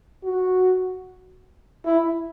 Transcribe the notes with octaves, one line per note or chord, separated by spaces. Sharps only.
F#4
E4